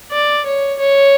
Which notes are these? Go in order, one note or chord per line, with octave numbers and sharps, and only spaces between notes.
D5
C#5
C#5